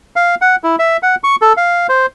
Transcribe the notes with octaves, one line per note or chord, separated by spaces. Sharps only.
F5
F#5
E4
E5
F#5
C#6
A4
F5
C5